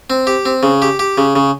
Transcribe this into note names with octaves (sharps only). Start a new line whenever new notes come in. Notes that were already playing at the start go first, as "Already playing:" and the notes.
C4
G4
C4
C#3
G4
G4
C#3
C#3